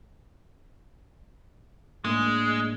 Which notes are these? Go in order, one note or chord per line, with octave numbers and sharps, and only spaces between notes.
A2 G#3 A#3 D4